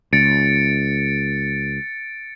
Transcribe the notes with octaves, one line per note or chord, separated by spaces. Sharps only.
C#2 A6 C#7 D7